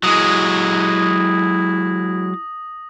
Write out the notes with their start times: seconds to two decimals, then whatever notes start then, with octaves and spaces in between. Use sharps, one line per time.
0.03 F#3 G#3 E4 D#6 A#6